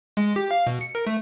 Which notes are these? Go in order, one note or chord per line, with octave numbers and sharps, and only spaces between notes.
G#3
G4
F5
B2
C#7
A#4
A3